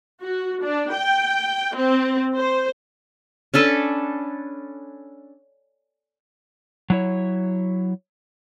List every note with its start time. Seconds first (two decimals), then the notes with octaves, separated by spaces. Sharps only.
0.22 F#4
0.62 D4
0.92 G5
1.75 C4
2.35 C5
3.54 C#4 D4 A4 B4
6.90 F#3 E4 C#5